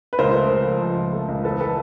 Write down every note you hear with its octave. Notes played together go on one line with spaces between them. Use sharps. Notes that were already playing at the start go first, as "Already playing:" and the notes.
B4
C#2 A#4 C5
A3
C#2
F3
F3
C#2
A3
C#2
E2 A4 B4
A4 B4